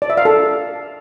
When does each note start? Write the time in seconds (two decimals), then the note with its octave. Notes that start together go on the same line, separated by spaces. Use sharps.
0.02 D5
0.10 E5
0.17 F5
0.25 A4